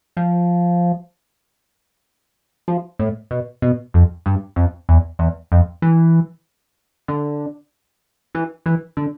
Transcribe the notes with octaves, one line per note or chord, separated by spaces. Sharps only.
F3
F3
A2
B2
B2
F2
G2
F2
E2
E2
F2
E3
D3
E3
E3
D3